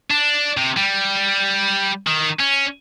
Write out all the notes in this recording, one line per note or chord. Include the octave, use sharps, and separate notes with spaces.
D4
C3
G3
D#3
C#4